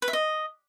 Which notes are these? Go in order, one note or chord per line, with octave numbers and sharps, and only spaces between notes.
B4
E5
D#5